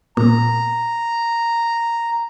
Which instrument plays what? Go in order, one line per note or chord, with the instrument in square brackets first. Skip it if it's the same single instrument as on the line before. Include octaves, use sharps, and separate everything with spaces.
[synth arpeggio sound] A#2 [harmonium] A#5